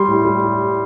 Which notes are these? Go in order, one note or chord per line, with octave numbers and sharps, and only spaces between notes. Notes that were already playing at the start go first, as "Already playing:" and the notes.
Already playing: G3 C6
A2
G3